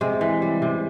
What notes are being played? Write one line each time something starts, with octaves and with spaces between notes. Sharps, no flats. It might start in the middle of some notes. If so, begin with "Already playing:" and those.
C3 G#3
E3
G3
C3